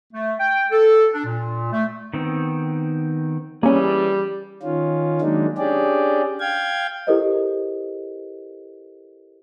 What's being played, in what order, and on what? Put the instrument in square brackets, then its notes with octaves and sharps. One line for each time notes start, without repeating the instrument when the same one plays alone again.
[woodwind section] A3
G5
A4
D4
A#2
A3
[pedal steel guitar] D#3 B3 C4
[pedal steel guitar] E3 G#4 [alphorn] G3 [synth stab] A#3 C#4
[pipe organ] D#3 C#4 F4
D#3 F#3 G#3 A#3 D4 D#4
C#4 D4 G4 G#4 D5
F5 G5 G#6
[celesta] E4 G4 A4 A#4 C5 D#5